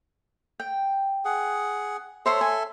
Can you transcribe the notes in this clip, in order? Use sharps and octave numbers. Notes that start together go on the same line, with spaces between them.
G5
G#4 F#5
A4 C5 C#5 E5 C6
G#5